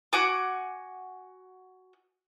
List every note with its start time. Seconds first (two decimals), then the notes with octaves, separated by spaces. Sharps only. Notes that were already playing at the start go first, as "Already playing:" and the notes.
0.13 F#4 F#5 G#5 D6